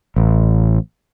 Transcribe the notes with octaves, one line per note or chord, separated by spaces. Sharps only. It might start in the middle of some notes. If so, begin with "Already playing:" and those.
A1